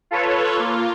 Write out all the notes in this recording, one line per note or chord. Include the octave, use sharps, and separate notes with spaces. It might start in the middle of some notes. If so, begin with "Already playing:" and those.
F4 A4 B4 C#5
A#3 F4